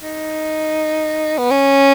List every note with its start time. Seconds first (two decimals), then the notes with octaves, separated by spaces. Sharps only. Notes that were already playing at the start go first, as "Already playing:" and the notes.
0.02 D#4
1.38 B3
1.51 C#4